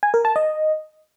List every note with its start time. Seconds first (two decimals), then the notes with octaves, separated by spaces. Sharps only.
0.03 G#5
0.14 A#4
0.25 A5
0.36 D#5